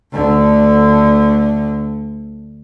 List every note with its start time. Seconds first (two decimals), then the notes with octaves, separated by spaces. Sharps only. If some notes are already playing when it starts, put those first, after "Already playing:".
0.13 D2 D3